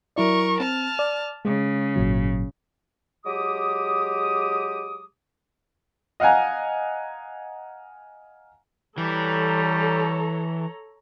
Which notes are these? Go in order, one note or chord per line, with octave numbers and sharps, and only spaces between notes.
F#3 E4 A#4 D5 C#6
C4 A5 F6
D5
C#3 G#3
G#1 A#2 F#3
F#3 G#3 G4 D6 D#6
D#5 F5 F#5 G#5 A#5
E3 G3 A4 C#5 A#5